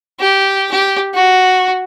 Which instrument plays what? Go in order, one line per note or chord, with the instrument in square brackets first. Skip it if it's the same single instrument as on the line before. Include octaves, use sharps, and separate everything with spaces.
[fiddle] G4
G4
F#4